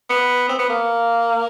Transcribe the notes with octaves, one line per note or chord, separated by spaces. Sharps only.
B3
C4
B3
A#3